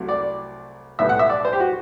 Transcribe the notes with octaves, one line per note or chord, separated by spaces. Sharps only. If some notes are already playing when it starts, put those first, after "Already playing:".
Already playing: C2 C3 F#3 A3
D5
B1 A2 G3 B3 E5
F#5
E5
D5
C5
G4
F#4